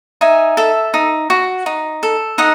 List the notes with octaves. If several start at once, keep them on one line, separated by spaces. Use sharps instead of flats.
D#4 E5 G#5
A4 E5
D#4
F#4
D#4
A4
D#4 D#5 F#5